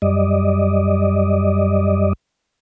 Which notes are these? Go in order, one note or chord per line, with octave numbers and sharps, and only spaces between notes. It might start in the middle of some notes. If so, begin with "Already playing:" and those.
F#2 G3 D5 D#5